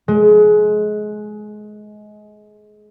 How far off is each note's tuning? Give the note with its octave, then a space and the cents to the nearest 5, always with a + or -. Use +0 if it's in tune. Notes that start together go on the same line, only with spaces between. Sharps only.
G#3 +25